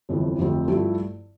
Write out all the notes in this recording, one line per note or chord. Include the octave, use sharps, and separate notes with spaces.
G1 F2 C3 E3
F1 F2 D3 A3 C4
G2 F3 A3 E4